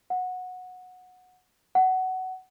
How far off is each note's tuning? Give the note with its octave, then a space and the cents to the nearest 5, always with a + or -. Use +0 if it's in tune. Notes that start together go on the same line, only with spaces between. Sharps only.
F#5 -15
F#5 +15